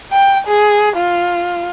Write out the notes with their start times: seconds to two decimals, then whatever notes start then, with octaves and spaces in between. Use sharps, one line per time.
0.12 G5
0.47 G#4
0.97 F4